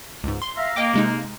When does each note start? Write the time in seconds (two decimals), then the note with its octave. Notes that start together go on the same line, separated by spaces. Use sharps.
0.24 C#2 G#2
0.42 C6
0.57 E5 F5 A#5
0.76 A#3 D#5 G5 D6
0.93 C3 G#3 D#4